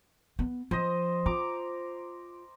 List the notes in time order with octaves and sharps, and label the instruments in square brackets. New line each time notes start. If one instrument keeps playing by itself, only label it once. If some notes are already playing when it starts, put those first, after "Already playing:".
[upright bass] B3
[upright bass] F3 [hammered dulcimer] C5 D#5
[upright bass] F4 [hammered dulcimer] A#5 D6